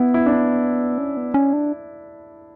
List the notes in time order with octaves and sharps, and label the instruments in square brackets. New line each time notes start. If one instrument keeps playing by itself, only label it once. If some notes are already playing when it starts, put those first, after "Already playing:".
Already playing: [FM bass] B3 [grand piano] E4
[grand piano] E4
D4
[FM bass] C#4
B3
C#4
D4